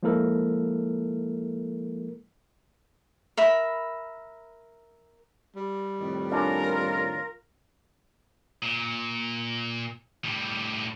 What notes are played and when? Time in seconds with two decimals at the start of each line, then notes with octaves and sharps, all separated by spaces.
0.03 F3 G#3 A#3 E4 A4 A#4
3.37 A#4 E5 B5
5.56 G3
5.99 F2 A2 D#3
6.32 C#4 D4 F4 A#4
8.62 A#2
10.25 A2 G3